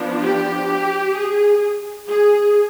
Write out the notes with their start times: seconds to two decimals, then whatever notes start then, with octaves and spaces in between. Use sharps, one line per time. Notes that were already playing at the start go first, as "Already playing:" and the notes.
Already playing: F3 B3 D4
0.22 G4
1.15 G#4
2.08 G#4